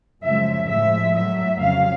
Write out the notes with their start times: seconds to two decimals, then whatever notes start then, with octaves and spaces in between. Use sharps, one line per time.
0.22 F#2 C#3 F3 G#3 E5
0.68 A2 F3 G#3 E5
1.14 A2 F#3 E5
1.60 F2 C#3 F#3 F5